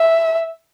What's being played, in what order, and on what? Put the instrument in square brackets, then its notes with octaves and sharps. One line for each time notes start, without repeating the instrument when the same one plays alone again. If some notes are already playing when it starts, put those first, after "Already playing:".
Already playing: [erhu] E5